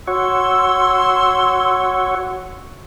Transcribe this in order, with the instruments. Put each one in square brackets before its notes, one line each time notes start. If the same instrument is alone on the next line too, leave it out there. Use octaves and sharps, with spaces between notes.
[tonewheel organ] F#4 C#5 [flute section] C6 E6